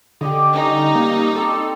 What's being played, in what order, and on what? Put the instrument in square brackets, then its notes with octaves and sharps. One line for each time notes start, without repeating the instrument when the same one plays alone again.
[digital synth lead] D3 [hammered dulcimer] G4 D5 D#5
[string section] G3 D#4 [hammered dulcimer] C#4
[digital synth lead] A#3
[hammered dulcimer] C4 G4 [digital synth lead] A4